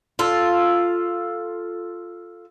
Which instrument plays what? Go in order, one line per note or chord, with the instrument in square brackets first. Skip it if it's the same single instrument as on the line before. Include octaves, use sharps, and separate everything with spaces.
[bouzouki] F4 A4